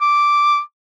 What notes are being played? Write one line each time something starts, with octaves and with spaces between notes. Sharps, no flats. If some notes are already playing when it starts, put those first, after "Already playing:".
D6